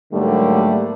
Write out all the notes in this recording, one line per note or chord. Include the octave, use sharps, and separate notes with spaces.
G#2 D3 F#3 G3 A3 A#3